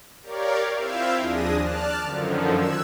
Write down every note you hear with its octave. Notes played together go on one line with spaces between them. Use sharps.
G4 A#4 C#5 D5 F5
C4 E4 F4 E5 F5 G5
D#2 F3 D4 G#4 D#6 A#6
D5 A5 F6 F#6
F#2 D3 D#3 F3
E6 F#6 G#6